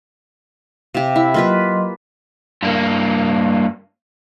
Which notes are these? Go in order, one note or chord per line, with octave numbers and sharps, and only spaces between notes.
C3 G4 F5
E4
F#3 A#3 F4 B4 D#5 C6
G2 A#3